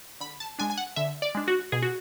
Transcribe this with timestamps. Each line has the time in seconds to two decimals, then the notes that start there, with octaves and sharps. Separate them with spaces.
0.21 D3 B5
0.40 A5
0.59 G#3 D4 G#5
0.70 G#5
0.78 F#5
0.96 D3 E5
1.22 D5
1.35 G#3 D4
1.48 F#4
1.72 B2 G#4
1.82 F#4